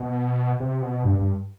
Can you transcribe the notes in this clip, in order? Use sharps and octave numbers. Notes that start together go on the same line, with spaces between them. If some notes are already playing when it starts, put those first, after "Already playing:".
Already playing: B2
C3
B2
G2
G2